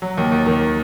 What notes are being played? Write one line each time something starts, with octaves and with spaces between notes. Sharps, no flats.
F#3
D#2
D#2
D#3